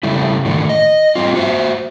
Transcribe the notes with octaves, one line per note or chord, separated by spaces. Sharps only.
C#3 G3 A3 E4
A2 D3 D#3
D#5
G3 C4 F4
F#4 C5 E5